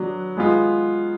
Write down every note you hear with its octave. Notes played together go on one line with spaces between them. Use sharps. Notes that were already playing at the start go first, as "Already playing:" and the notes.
Already playing: F#3 B3 D4
G#3 B3 F4